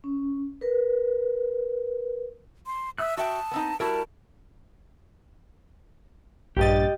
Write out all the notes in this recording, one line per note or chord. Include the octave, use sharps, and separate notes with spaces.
C#4
A#4 B4
C6
E5 D#6 E6 F#6
F#4 E5 G5 A5
B3 C4 D#4
G3 E4 F#4 A#4 A5
A#1 G2 G4 D#5 A6